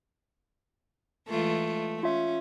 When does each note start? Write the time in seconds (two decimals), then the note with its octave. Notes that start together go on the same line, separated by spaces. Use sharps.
1.28 E3 G#3 A3 F4
2.03 C#4 F4 E5